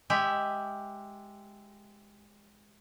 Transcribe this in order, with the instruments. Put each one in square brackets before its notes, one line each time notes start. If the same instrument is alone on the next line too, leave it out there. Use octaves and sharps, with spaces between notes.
[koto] G#3 G4 E5